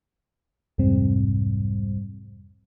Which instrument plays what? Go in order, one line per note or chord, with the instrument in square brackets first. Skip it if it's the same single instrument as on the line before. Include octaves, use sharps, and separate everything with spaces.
[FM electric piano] C2 F2 G#2 C3 G3 C4